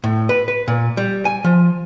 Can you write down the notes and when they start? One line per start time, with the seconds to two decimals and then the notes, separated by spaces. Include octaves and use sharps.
0.04 A2
0.29 B4
0.48 B4
0.68 A#2
0.97 G3
1.25 G#5
1.44 F3